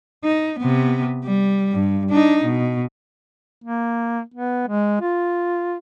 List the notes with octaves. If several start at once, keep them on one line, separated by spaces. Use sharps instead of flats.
D#4
C3 B3
G3
G2
D4 D#4
B2
A#3
B3
G#3
F4